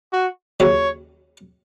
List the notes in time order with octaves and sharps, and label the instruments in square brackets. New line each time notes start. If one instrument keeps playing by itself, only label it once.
[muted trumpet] F#4
[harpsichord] D#2 C#3 F#3 C#4 E4 [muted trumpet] C#5